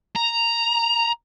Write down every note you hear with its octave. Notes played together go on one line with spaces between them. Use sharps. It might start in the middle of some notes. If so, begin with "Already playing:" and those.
A#5